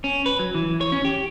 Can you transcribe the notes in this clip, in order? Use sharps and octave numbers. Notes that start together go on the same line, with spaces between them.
C#4
B4
F#3
E3
C#5
C#4
G4